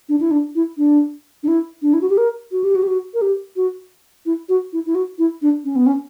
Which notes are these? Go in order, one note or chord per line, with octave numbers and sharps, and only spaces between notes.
D4
E4
D4
E4
D4
D4
E4
D4
E4
F#4
G4
A#4
F#4
G4
F#4
G4
F#4
A#4
G4
F#4
E4
F#4
E4
E4
F#4
E4
D4
C#4
B3
C#4